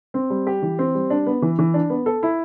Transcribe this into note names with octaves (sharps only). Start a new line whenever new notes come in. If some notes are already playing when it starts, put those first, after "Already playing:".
C4
G3
G4
E3
C4
G3
D4
B3
E3
E3
D4
B3
A4
E4